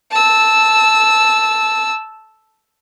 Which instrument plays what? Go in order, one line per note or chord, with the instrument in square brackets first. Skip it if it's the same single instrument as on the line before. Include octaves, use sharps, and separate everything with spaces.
[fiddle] A5 E6